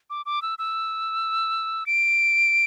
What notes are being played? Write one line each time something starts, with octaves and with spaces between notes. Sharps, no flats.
D6
D6
E6
E6
D7